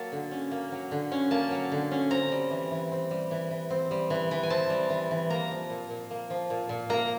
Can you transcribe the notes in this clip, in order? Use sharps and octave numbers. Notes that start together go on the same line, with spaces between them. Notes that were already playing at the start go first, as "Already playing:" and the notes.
Already playing: F#3 A#3 A5
D3
C#4
A#3
F#3
D3
C#4
A#3 A5
F#3
D3
C#4
C4 A#5
G3
E3
E3
C4
G3
E3
E3
C4
G3
E3
E3
G#5
C4 A5
G3
E3
E3
A#3 A#5
F3
A#2
A#2
A#3
F3
A#2
A#2
A#3 A#5